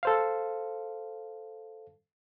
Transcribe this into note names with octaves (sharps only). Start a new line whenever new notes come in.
A4 C5 F5